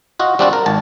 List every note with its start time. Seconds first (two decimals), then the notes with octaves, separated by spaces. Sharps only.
0.19 F4 F#4 D#5
0.39 G3 C4 D4 F4 F#4 D5
0.53 A#4
0.66 G#1 A5